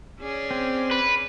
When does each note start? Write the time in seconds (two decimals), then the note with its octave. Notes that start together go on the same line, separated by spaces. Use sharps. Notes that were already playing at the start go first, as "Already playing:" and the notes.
0.20 C#4 G#4 D5
0.51 C4
0.91 B4